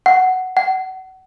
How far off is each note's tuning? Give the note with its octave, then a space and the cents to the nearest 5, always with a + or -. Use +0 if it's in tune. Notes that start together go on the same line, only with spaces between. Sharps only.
F#5 +5
F#5 +30